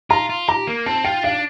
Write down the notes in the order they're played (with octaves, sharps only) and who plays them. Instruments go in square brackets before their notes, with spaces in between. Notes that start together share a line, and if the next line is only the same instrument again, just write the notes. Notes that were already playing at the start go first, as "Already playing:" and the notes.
[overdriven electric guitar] F4 [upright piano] A#5
[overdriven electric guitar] F4
[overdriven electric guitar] G4 [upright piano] A#5
[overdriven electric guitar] A#3
[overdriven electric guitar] C4 [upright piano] A5
[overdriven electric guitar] F4 [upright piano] G5
[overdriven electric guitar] D4 [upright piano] F5